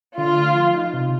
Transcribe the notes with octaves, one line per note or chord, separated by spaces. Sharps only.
D3 F4
A3
F3
D#4
C3